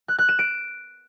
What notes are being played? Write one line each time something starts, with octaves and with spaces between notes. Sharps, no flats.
F#6
F#6
E7
D7